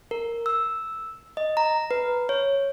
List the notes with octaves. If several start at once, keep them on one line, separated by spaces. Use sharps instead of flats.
A#4
E6
D#5
A#5
B4
C#5